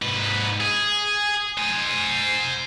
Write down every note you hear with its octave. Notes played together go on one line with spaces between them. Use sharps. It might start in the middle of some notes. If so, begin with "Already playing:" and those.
G#2 B4
G#4
C5 G#5